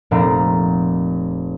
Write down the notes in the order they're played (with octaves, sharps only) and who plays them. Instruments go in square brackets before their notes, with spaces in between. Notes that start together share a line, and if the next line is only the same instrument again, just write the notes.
[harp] F1 A#2 C4 A#5 A#6